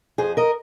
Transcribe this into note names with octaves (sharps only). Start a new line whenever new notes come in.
F2 G#4 C5
A#4 D#5